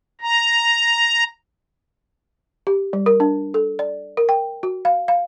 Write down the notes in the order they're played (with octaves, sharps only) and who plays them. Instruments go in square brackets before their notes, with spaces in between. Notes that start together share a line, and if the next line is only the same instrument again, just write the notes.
[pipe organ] A#5
[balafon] G4
G3
A#4
D4
A4
D5
A#4
G5
F#4
F5
F5